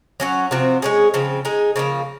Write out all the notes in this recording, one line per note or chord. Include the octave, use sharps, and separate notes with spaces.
F#3 C#4 F#4
C3 F3 C4 F#4
G#3 C#4 G#4
C#3 F3 C4
G#3 D#4 G#4
C#3 F3 A#3